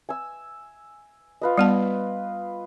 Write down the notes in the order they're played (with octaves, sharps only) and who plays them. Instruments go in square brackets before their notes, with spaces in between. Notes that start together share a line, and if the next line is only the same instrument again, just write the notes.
[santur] G#5 E6
F4 B4 D#5
[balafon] G3 B3 A5